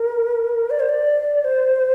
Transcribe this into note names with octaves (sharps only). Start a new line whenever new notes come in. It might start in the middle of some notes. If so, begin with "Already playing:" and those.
Already playing: A#4
D5
C5
D5
C5